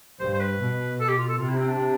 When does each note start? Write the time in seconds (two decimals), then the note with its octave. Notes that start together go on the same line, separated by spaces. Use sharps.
0.20 G2 C5
0.34 C5
0.40 B4
0.59 B2
1.00 A4
1.09 G4
1.18 F4
1.29 A4
1.38 C3 F4
1.48 E4
1.58 C4
1.68 D4